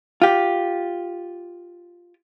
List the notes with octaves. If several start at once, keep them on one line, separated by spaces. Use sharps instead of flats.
F4 G4